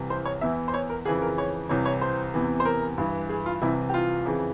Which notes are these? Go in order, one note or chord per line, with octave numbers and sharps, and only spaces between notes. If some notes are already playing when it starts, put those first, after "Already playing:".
Already playing: C2 C3 E3
C5
C#5
E2 E3 E5
C5
C#5
A#4
F2 C#3 E3 G#4
A#4
C#5
C2 C3 E3 C#5
C#5
C5
E2 C3 E3
C5
A#4
G2 E3
G#4
F4
C2 C3 E3 E4
G4
F4
F2 C#3 E3